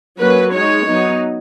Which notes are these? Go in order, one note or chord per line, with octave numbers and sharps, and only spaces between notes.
F#3 A#3 C#4 B4
G#3 D#4 C#5
F#3 B3 D#4